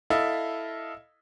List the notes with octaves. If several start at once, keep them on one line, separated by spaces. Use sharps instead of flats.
E4 A4 D#5 F5